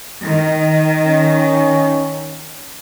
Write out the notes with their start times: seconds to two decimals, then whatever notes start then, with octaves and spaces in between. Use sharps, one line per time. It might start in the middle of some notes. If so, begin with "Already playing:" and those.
0.23 D#3
1.07 C#4